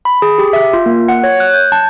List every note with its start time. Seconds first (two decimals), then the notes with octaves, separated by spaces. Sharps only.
0.05 B5
0.22 G#4
0.38 G4
0.53 E5
0.73 F4
0.86 A#3
1.08 F#5
1.24 C#5
1.40 F#6
1.54 G6
1.72 A5